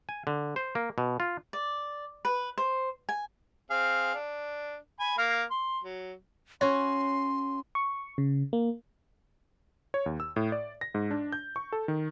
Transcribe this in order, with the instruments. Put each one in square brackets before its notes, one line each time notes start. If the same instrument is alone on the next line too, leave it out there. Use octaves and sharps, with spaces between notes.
[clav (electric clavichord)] G#5
D3
C5
A#3
B2
F4
[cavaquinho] D5
B4
C5
G#5
[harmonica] C4 G#4 F5
D4
G#5 B5
A#3 F5 F6
C6
F#3
[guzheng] C#4 F#4 [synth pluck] C#5 [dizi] C6
[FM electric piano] C#6
C#3
A#3
[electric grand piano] C#5
D#2
E6
A2
D5
A#6
G#2
D4
G6
C#6
A4
D#3